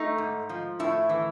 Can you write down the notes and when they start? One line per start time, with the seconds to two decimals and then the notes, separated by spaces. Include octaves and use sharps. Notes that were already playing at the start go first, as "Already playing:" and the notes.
Already playing: A3 D#4
0.18 G#2
0.49 F3
0.79 A2 E4
1.09 E3